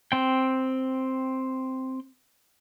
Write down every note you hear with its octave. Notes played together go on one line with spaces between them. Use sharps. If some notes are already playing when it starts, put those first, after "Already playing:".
C4 G5